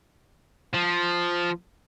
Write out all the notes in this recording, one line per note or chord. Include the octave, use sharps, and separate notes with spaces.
F3